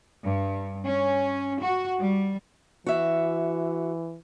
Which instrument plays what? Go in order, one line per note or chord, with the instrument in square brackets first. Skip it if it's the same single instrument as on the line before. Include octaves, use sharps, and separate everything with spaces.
[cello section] G2
C#4
F#4
G3
[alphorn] E3 [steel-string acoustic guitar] F#4 E5